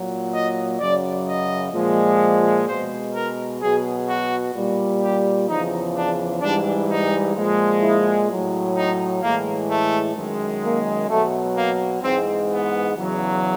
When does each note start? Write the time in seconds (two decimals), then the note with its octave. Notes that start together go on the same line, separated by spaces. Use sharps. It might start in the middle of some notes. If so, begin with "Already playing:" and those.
Already playing: A#2 F#3
0.33 D#5
0.79 F#2 C#3 F#3 D5
1.26 D#5
1.73 A#2 F3 G#3
2.66 B2 G#3 C5
3.14 A#4
3.61 B2 F#3 G#4
4.07 F#4
4.54 A#2 G3
5.01 G4
5.48 E2 C#3 F3 D#4
5.95 D4
6.41 G#2 E3 G3 D4
6.88 D#4
7.35 A#2 F3 G#3
7.81 E4
8.28 A2 F#3
8.75 D#4
9.22 A2 E3 G#3 A#3
9.69 A3
10.16 F#2 D#3 G#3
10.62 A#3
11.09 B2 F#3 A3
11.55 A#3
12.03 G#2 E3 G#3 C4
12.49 B3
12.96 E2 C#3 F#3